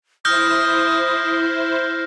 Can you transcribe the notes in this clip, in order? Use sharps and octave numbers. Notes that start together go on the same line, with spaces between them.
E4 C5 D#6 F6 G6 A#6